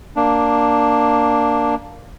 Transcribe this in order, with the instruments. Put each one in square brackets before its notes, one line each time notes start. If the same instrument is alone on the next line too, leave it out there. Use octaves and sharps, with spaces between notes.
[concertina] A#3 D4